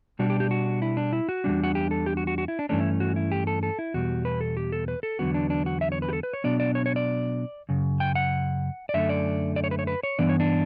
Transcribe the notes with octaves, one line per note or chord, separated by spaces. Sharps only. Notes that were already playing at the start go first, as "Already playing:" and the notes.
B2 G3 D4 F#4
G4
G4
F#4
E4
D4
E4
F#4
E2 B2 G3 D4
F#4
G4
A4
G4
F#4
F#4
F#4
E4
D4
G2 E3 A3 C#4 D4
E4
F#4
E4
G4
A4
A4
E4
E2 B2 G3 F#4
B4
A4
G4
A4
B4
A4
E2 D3 F#3 B3 F#4
D4
D4
F#4
E5
C#5
B4
G4
A4
B4
C#5
B2 F#3 B3 D4 D5
D5
C#5
C#5
D5
F#2 C#3
G5
F#5
D5
F#2 D3 A3 E5
D5
D5
C#5
B4
C#5
B4
C#5
G2 E3 B3 D4 D5
C#5
D4